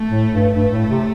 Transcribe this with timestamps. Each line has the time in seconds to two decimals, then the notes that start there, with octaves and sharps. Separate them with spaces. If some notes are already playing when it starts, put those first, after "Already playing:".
Already playing: A3
0.09 A2
0.32 G2
0.55 G2 A3
0.72 A2
0.89 C3